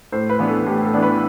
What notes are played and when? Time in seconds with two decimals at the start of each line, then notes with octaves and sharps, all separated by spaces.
0.12 A2 C5
0.30 B4
0.39 E3 B3 D4
0.48 A4
0.66 A2 G4
0.85 A4
0.94 E3 B3 D4
1.03 B4